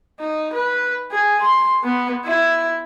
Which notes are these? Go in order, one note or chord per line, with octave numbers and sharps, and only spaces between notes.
D#4
B4
G#4
C6
B3
E4